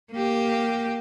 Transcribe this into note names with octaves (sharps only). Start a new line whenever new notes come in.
A#3 G4